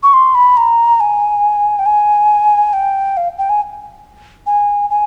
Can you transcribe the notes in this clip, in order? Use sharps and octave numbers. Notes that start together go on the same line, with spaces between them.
C#6
C6
B5
A#5
G#5
G5
G#5
G5
F5
G5
G#5
G#5
G#5